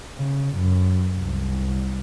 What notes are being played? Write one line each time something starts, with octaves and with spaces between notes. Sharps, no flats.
C#3
F#2
C2